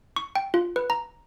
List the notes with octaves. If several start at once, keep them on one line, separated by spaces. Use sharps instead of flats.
C#6
G5
F4
B4
A#5